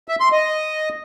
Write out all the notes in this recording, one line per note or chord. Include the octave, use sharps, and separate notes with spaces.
E5
C6
D#5